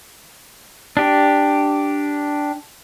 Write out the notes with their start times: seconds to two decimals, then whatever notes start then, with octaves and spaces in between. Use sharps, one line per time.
0.97 D4 G4